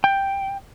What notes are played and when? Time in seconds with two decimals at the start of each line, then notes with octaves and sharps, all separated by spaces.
0.04 G5